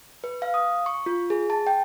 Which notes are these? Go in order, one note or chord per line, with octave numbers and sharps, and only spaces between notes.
B4
F5
D#6
C#6
F4
G#4
A5
G5